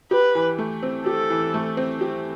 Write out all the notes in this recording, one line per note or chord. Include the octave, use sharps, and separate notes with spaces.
G4 B4
E3
A3
C4
G4 A4
E3
A3
C4
G4